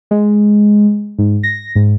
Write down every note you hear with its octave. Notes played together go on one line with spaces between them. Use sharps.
G#3
G#2
A#6
G#2